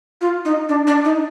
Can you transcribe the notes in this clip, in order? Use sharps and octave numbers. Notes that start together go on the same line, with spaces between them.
F4
D#4
D4
D4
D#4